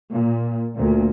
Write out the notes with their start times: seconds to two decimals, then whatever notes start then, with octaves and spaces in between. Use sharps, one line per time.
0.11 A#2
0.75 D2 A#2